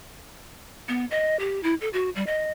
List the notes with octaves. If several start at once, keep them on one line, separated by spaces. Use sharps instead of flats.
B3
D#5
G4
E4
A4
F#4
G3
D#5